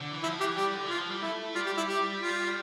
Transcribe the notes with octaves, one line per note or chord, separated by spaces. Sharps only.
D3
E3
F3 E4
E3 G4
G3 G4
D3
E3 F4
F3
G3
A3 E4
G3 F4
G4
E4
G4
F4